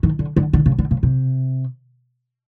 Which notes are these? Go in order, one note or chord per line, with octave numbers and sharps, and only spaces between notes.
D#3
D3
D3
D3
C#3
D3
C#3
C3